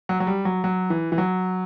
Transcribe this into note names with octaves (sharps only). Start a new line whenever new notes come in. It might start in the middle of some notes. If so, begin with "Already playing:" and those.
F#3
F#3
G3
F#3
F#3
E3
E3
F#3